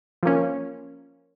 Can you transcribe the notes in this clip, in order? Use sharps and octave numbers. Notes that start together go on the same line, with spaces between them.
F3 A#3 C#4